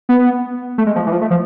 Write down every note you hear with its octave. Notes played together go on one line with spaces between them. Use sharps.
B3
A3
G#3
F3
E3
F3
A3
F3